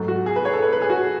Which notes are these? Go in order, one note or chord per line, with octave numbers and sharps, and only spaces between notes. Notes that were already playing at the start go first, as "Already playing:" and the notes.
Already playing: G#2 F#3 A3
F#4
G#4
B4
C#5
A4
B4
B4
G#4
F#4